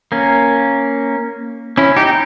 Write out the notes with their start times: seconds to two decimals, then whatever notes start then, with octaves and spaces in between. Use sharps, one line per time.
0.12 A#3 C#4
1.78 C#4 E4
1.96 D#4 G4